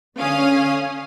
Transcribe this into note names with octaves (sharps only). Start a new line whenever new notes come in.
D3 C#4 F5 G#5 D#6 F6